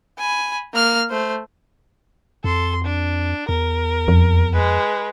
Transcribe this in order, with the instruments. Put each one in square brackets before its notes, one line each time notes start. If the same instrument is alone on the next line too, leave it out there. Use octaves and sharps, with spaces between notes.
[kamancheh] G#5 B5
A#3 F6
A3 C5
[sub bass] F2 [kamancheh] A4 C6
[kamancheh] D4
[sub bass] E2 [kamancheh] A#4
[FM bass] F2
[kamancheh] G#3 B4